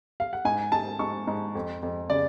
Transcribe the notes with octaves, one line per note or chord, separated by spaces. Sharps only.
F5
F#5
G#2 G#5
G#2 A5
G#2 C#6
G#2
F2
F2
C#3 D5